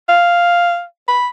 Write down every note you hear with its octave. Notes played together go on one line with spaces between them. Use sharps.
F5
B5